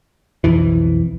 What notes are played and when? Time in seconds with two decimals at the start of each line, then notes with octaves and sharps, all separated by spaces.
0.44 B1 F2 E3